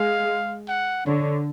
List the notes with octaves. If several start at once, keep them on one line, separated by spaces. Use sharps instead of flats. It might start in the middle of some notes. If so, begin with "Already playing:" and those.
Already playing: G#3 F5
F#5
D3 C#5